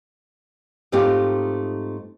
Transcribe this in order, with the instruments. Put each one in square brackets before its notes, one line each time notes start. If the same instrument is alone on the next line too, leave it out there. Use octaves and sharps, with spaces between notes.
[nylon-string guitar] G#2 A3 C4 D#4 F4 G4